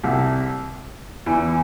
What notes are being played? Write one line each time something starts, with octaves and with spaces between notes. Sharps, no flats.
C2 C3
E2 E3